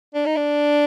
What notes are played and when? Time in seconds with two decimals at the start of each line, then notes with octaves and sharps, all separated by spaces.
0.15 D4
0.26 D#4
0.37 D4